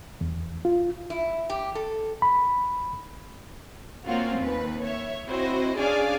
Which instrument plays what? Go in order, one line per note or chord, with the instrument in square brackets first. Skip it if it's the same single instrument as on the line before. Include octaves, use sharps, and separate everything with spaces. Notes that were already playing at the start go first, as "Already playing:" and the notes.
[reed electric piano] E2
F4
[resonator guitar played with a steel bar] E4
G4
A4
[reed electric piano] B5
[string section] A#3 C4 C#4 F4 F#4
D#2 B4
C#5 E5
C4 E4 F#4 C5 D#5
C#4 D4 G#4 D5 F5 G#5